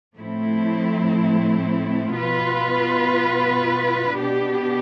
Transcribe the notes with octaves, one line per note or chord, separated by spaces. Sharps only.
A2 F3 A3 C4 E4
B2 B3 F4 B4
B2 B3 D4 G4